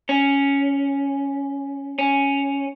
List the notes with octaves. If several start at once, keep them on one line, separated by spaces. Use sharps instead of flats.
C#4
C#4